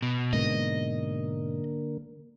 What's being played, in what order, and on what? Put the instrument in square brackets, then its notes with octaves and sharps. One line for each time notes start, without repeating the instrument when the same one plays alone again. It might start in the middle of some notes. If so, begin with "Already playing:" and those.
[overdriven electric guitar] B2
[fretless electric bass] G#2 B2 [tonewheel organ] D3 A#3 [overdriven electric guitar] D#5